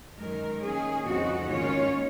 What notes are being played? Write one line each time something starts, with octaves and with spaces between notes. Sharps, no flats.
F#2 D#3 G#3 A#4
D#3 A#3 C#4 G#4
F2 C#3 G#3 C4 D#4 F#4
G#2 D#3 A#3 C#4 F4 C#5